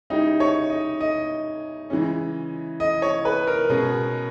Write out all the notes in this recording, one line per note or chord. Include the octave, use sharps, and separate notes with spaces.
C#3 G#3 C#4 D#4 E4 G4
C#5
D#5
D#5
C#3 E3 G#3 C#4
D#5
C#5
B4
A#4
B2 G#3 C#4 G#4